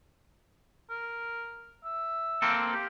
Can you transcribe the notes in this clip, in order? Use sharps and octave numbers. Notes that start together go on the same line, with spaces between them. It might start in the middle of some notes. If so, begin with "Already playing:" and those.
A#4
E5
A#3 C4 A4
G4